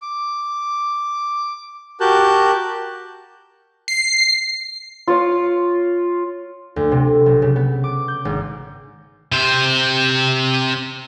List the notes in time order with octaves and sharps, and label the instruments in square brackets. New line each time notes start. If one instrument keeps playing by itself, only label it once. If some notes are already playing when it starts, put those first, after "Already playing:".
[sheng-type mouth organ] D6
F#4 G4 A#4 A5 F#6 G6
[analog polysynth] C7
[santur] F4 C#5
[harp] D2
C3
B1
C#3
B3
D6
G6
G#1
[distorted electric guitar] C3 C5